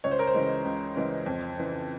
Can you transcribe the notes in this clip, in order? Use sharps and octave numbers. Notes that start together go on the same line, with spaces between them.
C#2 C#5
C5
A#4
C5
C#3 E3 G#3
C#2
C#3 E3 G#3
F2
C#3 E3